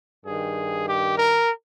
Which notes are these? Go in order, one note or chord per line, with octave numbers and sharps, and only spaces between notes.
G2 D#3 G#4
G4
A#4